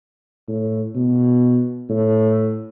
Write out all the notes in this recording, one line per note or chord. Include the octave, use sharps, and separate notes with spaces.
A2
B2
A2